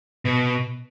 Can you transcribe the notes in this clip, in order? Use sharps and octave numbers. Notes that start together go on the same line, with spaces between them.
B2